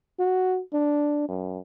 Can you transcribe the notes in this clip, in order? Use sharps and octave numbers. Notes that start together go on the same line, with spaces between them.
F#4
D4
F#2